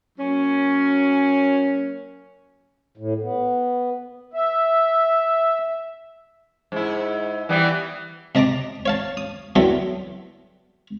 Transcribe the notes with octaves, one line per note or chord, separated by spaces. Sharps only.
F#3 A#3 C#4
A2
B3
E5
G#2 E4
E3 G3 B3
C3 D#5 A5 A#5 D6
C#5 F5 A5
D#6
F#3 G3 B3 E4 A4